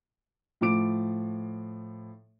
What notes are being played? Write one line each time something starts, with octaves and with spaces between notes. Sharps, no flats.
A2 F3 D6 D7